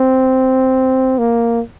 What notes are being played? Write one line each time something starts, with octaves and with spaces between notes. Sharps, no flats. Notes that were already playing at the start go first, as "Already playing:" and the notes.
Already playing: C4
A#3